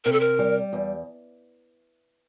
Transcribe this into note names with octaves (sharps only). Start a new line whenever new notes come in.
C3 A#4
A4
A#4
G3
E2